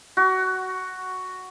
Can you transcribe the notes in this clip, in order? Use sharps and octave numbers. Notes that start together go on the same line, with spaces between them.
F#4